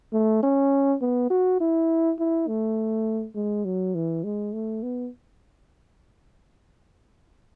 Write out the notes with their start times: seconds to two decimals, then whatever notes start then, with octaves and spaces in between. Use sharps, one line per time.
0.13 A3
0.43 C#4
1.01 B3
1.30 F#4
1.60 E4
2.19 E4
2.48 A3
3.35 G#3
3.65 F#3
3.95 E3
4.24 G#3
4.53 A3
4.83 B3